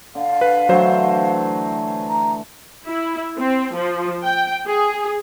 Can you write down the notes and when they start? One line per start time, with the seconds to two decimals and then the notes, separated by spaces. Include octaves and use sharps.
0.15 D3 F5
0.41 B4
0.69 D3 E3 F#3 A3 C5
2.09 A#5
2.86 E4
3.38 C4
3.75 F3
4.23 G5
4.67 G#4